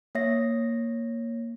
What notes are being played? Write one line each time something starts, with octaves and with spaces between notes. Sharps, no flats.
A#3 C#5 E5 A#6 C7